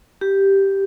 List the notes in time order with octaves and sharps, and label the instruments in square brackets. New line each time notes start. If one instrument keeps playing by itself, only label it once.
[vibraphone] G4